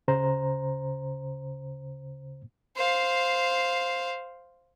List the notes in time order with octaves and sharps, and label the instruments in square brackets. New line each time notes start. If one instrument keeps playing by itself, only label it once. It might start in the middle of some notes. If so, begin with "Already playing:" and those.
[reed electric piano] D2 C#3 C5 A#5
[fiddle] C5 F5